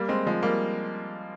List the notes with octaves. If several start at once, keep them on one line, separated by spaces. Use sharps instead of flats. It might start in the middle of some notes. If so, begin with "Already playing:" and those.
Already playing: G3 A#3
G#3 C4
F3 G#3
G3 A#3